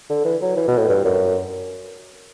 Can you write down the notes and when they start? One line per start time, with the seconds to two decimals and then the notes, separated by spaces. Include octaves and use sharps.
0.10 D3
0.25 E3
0.42 F#3
0.57 E3
0.68 B2
0.78 A2
0.89 G2
1.05 F#2